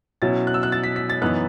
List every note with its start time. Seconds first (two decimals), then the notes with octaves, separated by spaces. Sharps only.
0.22 B2 F#3 C#4 E4 A6
0.47 F#6
0.54 E6
0.63 F#6
0.72 A6
0.84 B6
0.96 B6
1.10 A6
1.22 F#2 E3 B3 D#4 F#6